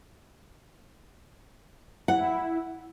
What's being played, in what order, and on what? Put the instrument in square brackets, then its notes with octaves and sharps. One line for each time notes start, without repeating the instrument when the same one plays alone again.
[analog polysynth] E4 [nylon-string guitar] F#5